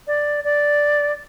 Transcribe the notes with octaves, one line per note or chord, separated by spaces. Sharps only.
D5
D5